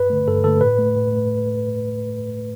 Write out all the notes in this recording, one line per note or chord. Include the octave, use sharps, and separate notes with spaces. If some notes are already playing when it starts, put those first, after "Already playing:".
Already playing: G2 B4
D3 A3
G2 A4
D3 A3 A4
A2 B4
A3
A2
A3